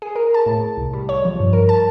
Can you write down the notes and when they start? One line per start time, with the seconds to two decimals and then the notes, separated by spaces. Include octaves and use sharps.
0.02 G#4
0.16 A#4
0.34 A5
0.46 A2
0.77 C2
0.93 G3
1.09 C#5
1.25 F3
1.40 G2
1.53 A#4
1.69 A5